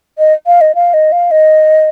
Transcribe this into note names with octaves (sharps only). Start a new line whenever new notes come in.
D#5
F5
D#5
F5
D#5
F5
D#5